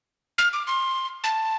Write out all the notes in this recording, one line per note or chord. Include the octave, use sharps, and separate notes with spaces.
F6
D6
C6
A5